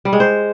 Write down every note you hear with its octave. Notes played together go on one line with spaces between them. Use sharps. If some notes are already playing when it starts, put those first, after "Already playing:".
G3
G#3
C5